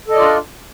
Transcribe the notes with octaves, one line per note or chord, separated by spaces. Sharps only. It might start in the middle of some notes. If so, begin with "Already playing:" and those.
D4 F4 A4 D5 D#5